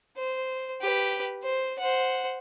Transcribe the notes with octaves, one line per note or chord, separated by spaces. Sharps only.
C5
G4 B4
C5
C5 F#5